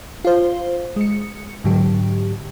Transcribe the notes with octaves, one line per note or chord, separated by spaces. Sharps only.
F4 C5
G#3 C#7
G#2 D3 F#3 G4